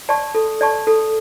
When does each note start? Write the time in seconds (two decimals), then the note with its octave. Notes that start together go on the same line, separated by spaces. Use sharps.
0.09 D5 A5 C#6
0.35 A4
0.61 D5 A5 C#6
0.87 A4